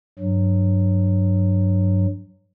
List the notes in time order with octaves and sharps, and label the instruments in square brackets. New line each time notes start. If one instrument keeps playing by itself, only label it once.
[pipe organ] G2 F#3